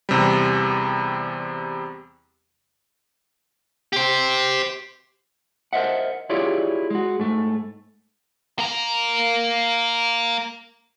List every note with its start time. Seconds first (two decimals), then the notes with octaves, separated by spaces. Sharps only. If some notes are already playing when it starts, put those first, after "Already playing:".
0.09 E2 C3 G3
3.93 G4 C5
5.73 A#4 C5 D#5 E5 F#5
6.30 E4 F4 G4 G#4 C#5 D5
6.90 G#3 F#4
7.19 G#2 A3
8.59 A#3 A#4